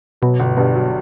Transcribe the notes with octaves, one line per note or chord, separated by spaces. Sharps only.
B2 F#3
G1
G2 B2
F#3